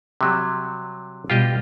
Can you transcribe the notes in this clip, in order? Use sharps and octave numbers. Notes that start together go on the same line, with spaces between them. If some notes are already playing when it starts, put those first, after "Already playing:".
C3 F#3 G3
B2 G3 F4 G4 D#5